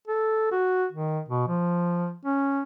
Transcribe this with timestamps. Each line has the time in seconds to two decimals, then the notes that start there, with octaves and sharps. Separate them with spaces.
0.07 A4
0.52 F#4
0.92 D#3
1.29 B2
1.48 F3
2.25 C#4